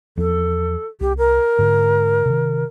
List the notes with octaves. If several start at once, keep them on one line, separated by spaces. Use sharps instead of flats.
E2 F3 A4
C2 G4
A#4
G#2 D3
C3 D#3